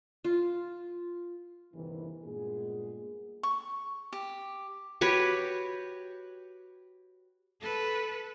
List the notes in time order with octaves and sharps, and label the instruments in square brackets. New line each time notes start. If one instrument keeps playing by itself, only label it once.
[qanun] F4
[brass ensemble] G1 D#2 C3 D#3 E3
G2 A#2 G#3 B3 G#4
[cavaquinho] C#6
G4
[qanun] F#4 G4 B4 C#5
[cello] A4 B4